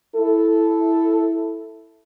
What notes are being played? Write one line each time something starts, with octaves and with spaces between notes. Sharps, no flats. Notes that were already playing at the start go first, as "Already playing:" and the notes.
E4 A4